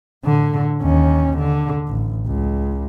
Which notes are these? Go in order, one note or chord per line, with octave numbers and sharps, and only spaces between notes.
A2 D3
D#2 C#4
D3
A1
C#2